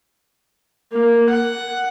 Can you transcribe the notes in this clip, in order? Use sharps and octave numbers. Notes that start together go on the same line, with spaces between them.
A#3
F#5